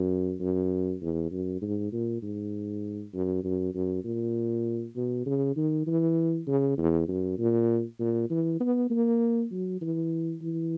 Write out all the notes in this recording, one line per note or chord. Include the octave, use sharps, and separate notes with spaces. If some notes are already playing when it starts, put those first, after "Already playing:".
Already playing: F#2
F#2
E2
F#2
G#2
A#2
G#2
F#2
F#2
F#2
A#2
B2
C#3
D#3
E3
C#3
E2
F#2
A#2
A#2
E3
B3
A#3
F#3
E3
E3